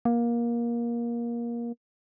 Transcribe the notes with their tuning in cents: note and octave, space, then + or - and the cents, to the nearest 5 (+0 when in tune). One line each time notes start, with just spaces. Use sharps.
A#3 +20